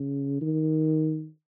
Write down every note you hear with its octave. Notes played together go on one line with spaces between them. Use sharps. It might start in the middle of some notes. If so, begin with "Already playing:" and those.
Already playing: C#3
D#3